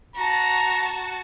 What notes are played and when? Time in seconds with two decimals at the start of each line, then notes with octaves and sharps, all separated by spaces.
0.16 F#4 A5 A#5